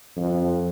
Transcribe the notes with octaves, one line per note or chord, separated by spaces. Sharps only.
F2